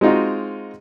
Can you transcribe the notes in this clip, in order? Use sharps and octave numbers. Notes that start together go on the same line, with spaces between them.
G#3 C4 D#4 F4 F#4